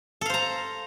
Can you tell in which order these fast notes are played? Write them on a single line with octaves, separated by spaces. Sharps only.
A4 F5 C5 A#5